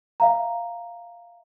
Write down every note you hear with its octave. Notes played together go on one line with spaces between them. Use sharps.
E5 F5 A#5